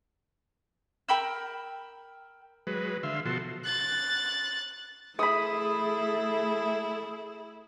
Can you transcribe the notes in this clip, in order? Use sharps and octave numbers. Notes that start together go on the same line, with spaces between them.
A#4 G5 B5 E6
F#3 G#3 B4
D3 E5 F5 C6
B2 F3 F#4 A4 C6
F#6 A6
A3 E4 G#4 B5 D#6